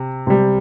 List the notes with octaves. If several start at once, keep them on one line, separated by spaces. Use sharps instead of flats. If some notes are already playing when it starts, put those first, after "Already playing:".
Already playing: C3
C3 G3